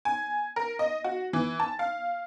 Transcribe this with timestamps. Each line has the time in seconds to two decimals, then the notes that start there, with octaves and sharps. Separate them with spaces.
0.05 G#5
0.56 A#4
0.79 D#5
1.04 F#4
1.33 E3
1.60 A5
1.79 F5